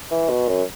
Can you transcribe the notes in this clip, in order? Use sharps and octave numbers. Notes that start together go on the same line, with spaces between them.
E3
B2
F#2